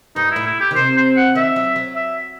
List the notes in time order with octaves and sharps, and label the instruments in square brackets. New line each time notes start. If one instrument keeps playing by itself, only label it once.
[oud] G2 [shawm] D#4
[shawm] E4
[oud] A2
[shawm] E4
G4
[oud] D#3
[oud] C3 [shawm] C5
[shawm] C5
F#5
[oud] D#3 [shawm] E5
[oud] F#3
F#3
[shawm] E5